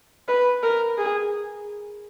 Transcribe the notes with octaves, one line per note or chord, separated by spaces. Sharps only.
B4
A#4
G#4